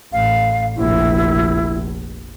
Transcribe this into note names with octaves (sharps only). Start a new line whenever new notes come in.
A1 F5
F1 A#1 E4